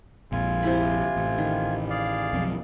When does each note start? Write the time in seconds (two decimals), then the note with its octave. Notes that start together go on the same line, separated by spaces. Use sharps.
0.32 A#1 F2 F4 G#5
0.63 C3 E4 B5
1.17 A1
1.38 D#3
1.90 G#4 D5 F5
2.33 B1 F2